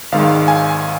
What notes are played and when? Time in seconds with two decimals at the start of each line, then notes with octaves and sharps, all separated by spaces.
0.12 G#1 G#2 D#3 G#3 F5
0.48 G#5